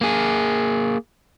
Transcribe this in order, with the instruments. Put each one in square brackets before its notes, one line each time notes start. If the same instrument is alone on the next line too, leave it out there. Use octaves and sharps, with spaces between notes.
[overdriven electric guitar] A#3 G#4